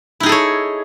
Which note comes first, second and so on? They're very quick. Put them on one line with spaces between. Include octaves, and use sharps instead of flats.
E4 D#4 G#4 A4 C#5